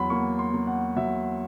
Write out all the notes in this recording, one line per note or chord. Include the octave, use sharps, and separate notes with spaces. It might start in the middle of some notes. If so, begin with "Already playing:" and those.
Already playing: E2 F#3 B5 C6
A#3 C#6
C6
A#3
F#5
F#3 E5